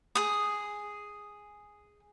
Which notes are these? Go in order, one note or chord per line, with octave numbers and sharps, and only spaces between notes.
G#4 D#6